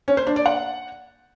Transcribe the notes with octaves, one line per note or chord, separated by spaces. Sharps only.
C#4
C5
D4
D5
F#5